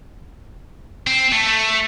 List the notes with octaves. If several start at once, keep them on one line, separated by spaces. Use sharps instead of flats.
C4
A3
A3